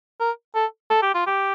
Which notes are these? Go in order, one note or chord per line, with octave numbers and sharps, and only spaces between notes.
A#4
A4
A4
G4
F4
G4